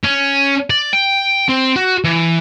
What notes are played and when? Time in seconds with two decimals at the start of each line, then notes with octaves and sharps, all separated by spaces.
0.04 C#4
0.70 D5
0.93 G5
1.49 C4
1.76 F#4
2.04 E3